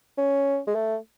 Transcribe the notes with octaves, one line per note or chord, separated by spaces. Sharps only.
C#4
G#3
A3